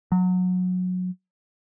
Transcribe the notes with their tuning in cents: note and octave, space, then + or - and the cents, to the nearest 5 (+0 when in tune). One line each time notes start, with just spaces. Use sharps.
F#3 -20